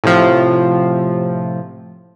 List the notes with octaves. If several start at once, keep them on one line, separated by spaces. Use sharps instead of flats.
A2 C3 F3